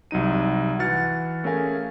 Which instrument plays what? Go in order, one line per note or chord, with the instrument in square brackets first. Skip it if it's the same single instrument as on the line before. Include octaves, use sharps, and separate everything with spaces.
[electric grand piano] C2 F#3 D#4 D#7
E3 F#4 F#5 F6 A6 C#7
A3 C#4 G#4 A#4 F5 G#5